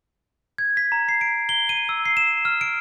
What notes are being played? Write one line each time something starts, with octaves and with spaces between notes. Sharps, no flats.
G#6
B6
A#5
C7
D7
G7
D#7
E6
C7
E7
F6
D7